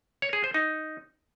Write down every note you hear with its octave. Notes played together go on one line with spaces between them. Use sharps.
C#5
G#4
C5
D#4